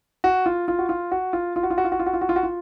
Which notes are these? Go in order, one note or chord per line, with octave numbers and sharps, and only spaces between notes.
F#4
F4
F4
F#4
F4
F#4
F4
F4
F#4
F4
F#4
F4
F#4
F4
F#4
F4
F#4
F4
F#4
F4